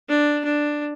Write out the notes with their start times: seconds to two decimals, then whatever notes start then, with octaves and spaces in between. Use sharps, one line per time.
0.09 D4
0.45 D4